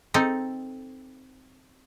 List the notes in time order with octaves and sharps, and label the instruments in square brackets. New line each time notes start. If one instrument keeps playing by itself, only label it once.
[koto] C4 D#4 A4